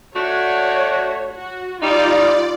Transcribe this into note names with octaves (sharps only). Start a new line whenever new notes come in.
A3 D4 F#4 C#5
F#4
G3 D#4 F4 D5